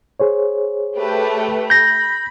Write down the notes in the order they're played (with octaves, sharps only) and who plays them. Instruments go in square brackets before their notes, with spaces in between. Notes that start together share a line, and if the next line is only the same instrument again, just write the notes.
[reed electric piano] G#4 C5 C#5
[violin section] A3 G4 B4
[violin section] B5 [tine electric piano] G6 A#6